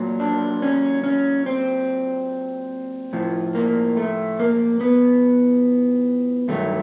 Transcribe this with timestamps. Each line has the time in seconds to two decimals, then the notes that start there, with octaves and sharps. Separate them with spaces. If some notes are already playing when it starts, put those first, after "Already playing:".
Already playing: A#2 F#3
0.20 D4
0.62 C#4
1.04 C#4
1.46 C4
3.13 A2 F3
3.55 A#3
3.97 A3
4.40 A#3
4.81 B3
6.48 G2 D#3 F#3 A3